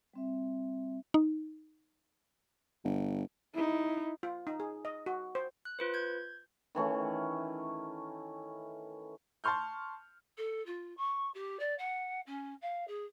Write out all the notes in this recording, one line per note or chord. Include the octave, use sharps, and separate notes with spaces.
G3 C4 E5
D#4
G1
D#4 E4
F4
D#4
G#4
D#5
F#4
C5
F#6
F4 B4 C5
G6 G#6
D#3 E3 A3 C#4
A5 C6 C#6 F6 G6
A4
F4
C#6
G4
D5
F#5
C#4
F5
G#4